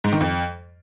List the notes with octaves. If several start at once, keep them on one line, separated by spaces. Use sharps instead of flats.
G#2
D#3
F2